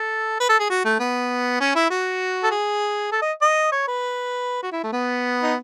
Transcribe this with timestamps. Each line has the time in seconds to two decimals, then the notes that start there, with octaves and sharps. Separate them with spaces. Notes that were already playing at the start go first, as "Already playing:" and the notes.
Already playing: A4
0.40 B4
0.49 A4
0.59 G#4
0.70 F#4
0.85 A3
1.00 B3
1.60 C#4
1.75 E4
1.91 F#4
2.43 A4
2.51 G#4
3.12 A4
3.22 D#5
3.42 D#5
3.72 C#5
3.87 B4
4.62 F#4
4.72 E4
4.83 A3
4.92 B3
5.43 D#4